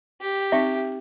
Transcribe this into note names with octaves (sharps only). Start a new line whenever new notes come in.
G4
C4 D#4 E5